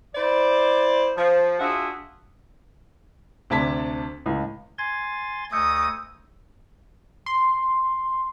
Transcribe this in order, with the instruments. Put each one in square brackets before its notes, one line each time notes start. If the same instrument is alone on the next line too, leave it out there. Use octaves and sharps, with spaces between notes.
[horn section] E4 C5 D5
F3
D4 F4 F#4 G#4 E5
[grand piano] D2 C3 D4 A5 G#6 B6
C#2 A2
[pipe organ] G#5 C6 A6 [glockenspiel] G#6
[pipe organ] D2 A3 D#5 [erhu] D#6 [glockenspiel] E6 G6 C#7
[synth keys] C6